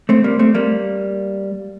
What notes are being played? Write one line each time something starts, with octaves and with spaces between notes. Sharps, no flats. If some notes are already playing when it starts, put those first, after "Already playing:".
A3 C4
G3 A#3
A3 C4
G3 A#3